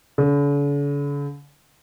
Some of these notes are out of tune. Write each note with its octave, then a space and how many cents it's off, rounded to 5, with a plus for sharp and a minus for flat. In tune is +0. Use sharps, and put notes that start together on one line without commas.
D3 -45